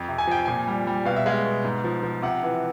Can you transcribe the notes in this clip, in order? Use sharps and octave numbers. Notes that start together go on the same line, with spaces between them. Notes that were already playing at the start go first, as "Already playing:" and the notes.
Already playing: F2
C3
G#5
F3 G5
A#2 G#5
G3
G3
B2 F5
E5
G#3 F5
B2
G#2
F3
F3
C3 F#5
E3